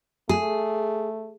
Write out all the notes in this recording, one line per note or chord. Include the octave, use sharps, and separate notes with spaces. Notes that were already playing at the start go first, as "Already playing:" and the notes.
A3 G#4